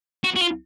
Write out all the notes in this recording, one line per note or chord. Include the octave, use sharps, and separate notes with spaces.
F#4
F#4
F4